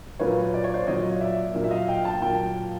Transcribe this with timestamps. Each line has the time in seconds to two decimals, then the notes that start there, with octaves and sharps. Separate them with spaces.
0.20 A#2 F#3 A#3 B4 C#5
0.54 D5
0.64 C#5
0.74 C5 D5
0.87 A#2 F#3 A#3 C#5 D#5
1.21 D5 E5
1.54 A#2 F#3 A#3
1.64 E5
1.71 D#5 F5
1.88 F5 G5
2.04 G5 A5
2.22 A#2 F#3 A#3 G5 A5